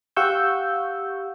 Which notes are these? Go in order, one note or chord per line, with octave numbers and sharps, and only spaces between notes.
G4 F5 F#5 C#6 E6 G6